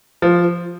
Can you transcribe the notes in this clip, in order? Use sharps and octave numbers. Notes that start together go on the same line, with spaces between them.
F3